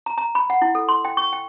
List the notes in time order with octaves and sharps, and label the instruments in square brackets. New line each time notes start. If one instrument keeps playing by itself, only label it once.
[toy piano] A#5
A#5
B5
F#5
E4
A4
C6
G5
C#6
G5